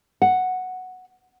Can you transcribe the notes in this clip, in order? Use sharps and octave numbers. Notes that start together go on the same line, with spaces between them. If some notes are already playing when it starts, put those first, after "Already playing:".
F#5